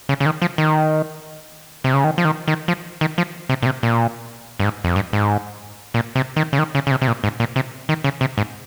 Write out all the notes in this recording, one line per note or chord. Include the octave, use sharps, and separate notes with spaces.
C#3
C#3
D#3
F3
D#3
C3
C#3
D#3
F3
D#3
D#3
F3
D#3
F3
C3
A#2
C3
A#2
G2
G#2
F2
G2
G#2
A#2
C3
D#3
C#3
D#3
C#3
C#3
C3
C3
A#2
G#2
A#2
C3
D#3
C#3
C3
G#2